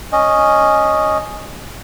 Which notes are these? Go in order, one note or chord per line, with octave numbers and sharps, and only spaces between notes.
C#4 D#5